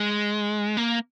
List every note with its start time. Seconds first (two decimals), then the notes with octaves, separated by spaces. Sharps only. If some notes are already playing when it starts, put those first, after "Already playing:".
Already playing: G#3
0.77 A#3